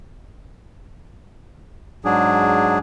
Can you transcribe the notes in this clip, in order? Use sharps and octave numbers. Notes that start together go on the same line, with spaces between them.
G#2 F#3 D4 G#4